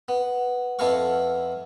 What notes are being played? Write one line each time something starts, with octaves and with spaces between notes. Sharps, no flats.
B3
F2 B3 E4 A4 F5 C#6